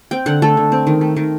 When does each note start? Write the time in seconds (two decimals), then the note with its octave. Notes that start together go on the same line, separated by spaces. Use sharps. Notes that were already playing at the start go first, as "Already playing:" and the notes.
0.11 C4 G5
0.26 D3 F#5
0.42 A3 A4
0.57 D3
0.72 C4
0.87 D#3
1.01 A3
1.17 D#3